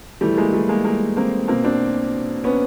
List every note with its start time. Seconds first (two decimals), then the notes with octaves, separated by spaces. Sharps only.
0.21 A2 E3 G3 A3
0.37 G#3 A#3
0.53 G3 A3
0.69 G#3 A#3
0.84 G#3 A#3
1.17 A#3 C4
1.48 B2 A#3 C4
1.64 C4 D4
2.44 B3 C#4